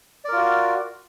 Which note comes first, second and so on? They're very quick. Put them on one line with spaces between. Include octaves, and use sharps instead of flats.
D5 A#4 F4 F#4